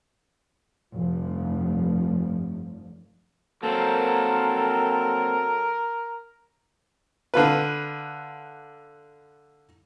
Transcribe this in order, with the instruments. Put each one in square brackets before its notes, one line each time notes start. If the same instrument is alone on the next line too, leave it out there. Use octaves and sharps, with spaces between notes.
[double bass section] F1 G2 F3
[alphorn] F#3 [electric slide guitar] A#3 C4 [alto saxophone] A4 [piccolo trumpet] A#4
[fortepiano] D3 F4 B4